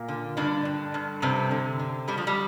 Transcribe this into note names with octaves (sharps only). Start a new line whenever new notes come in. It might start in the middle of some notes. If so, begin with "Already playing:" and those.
Already playing: A#2 A#3
D3
G2 D3 D4
G2
G2
G2 C3 C4
D3
D3
G2 G3
F3
G3